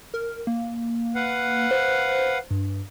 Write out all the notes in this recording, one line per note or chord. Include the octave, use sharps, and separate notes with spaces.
A#4
A#3
B4 F5 F#5
C5
G2